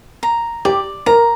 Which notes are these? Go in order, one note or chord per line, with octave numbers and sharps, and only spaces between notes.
A#5
G4 D5
A#4 A#5